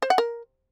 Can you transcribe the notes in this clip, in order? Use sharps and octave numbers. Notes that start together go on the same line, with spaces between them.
C5
F#5
A#4